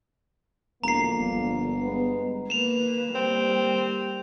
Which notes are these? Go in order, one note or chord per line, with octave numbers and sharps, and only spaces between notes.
E1 D3 F3 A#3 A#5 C7
G1
G#3 B3
A#3 B4 E7 F7
G3 A#3 C4